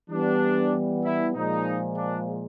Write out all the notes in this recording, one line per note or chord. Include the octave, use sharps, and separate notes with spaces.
E3 G3 B3 D4
E4
A#2 F3 G#3 D#4
D4